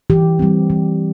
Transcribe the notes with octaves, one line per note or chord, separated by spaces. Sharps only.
E3 G4
G3 C4
E3